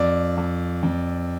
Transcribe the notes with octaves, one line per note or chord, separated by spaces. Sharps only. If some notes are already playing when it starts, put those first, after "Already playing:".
Already playing: F2 D5
F2
F2